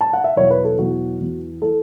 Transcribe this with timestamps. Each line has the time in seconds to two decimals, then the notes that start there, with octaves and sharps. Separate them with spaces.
0.01 A5
0.13 F#5
0.24 E5
0.36 E2 B2 F#3 C#5
0.50 B4
0.65 A4
0.78 E2 B2 F#3 F#4
1.20 E2 E3
1.62 E3 A4